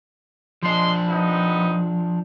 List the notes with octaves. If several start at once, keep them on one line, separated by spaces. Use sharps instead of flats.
F3 G#3 D4 C6
B3 C4 D#4